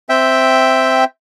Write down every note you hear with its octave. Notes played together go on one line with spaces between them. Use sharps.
C4 E5 G5